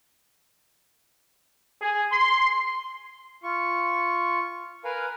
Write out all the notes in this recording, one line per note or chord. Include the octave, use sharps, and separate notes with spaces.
G#4
C6
F4 C#6
A#4 B4 F5 G#5